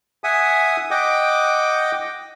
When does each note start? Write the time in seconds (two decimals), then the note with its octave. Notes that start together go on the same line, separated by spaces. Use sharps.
0.24 E5 F#5 G#5 D#6
0.91 D#5 F#5 G5 D6